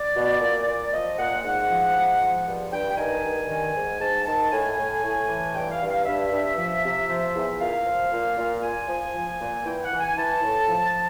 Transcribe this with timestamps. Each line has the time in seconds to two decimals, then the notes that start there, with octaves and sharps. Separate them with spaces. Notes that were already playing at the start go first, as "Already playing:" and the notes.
Already playing: D5
0.15 B2
0.41 A#2
0.67 A#2
0.92 F3 D#5
1.18 A#2 F#5
1.44 G#2 F#5
1.69 F3
1.95 G#2
2.21 F3
2.46 G2
2.72 G2 G5
2.90 G5
2.97 D#3 G#5
3.24 G2
3.49 D#3
3.75 G#2
4.00 G#2 A5
4.26 D#3 A5
4.52 A2 G#5
4.78 A2
5.03 A2
5.29 E3
5.55 G2 G5
5.72 F5
5.80 G2
5.89 F5
6.06 G2 E5
6.32 G2
6.57 F3
6.83 C3
7.09 F3
7.34 E2
7.60 A#2 F5
7.86 F3
8.11 A#2
8.38 A#2
8.63 A#2 G#5
8.88 F3
9.15 F3
9.40 A#2
9.66 E3 G5
9.83 F#5
9.92 E3
10.00 G#5
10.17 E3 A5
10.43 A2
10.68 F3